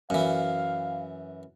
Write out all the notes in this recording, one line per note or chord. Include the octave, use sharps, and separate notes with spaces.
F#2 E3 F5